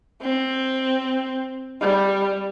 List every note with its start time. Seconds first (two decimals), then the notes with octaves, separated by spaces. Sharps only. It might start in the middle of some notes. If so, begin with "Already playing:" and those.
0.22 C4
1.81 G3